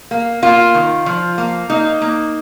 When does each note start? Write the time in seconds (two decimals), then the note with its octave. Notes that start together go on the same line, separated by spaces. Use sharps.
0.11 A#3
0.42 A#3 F4
0.74 D#3
1.06 F3
1.38 A#3
1.70 A#3 D#4
2.02 A#3